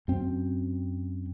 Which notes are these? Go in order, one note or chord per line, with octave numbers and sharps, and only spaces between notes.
F#2 C4